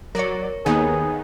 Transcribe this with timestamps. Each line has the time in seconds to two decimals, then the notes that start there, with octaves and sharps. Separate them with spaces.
0.15 F#3 A#4 C#5 D5
0.66 D#2 D#3 B3 D#4 G#4